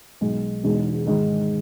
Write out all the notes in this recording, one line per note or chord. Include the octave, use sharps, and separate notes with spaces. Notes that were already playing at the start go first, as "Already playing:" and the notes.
B1 B2 G#3
E1 E2 B2 G#3 D#4
G#2 D#3 G#3 D#4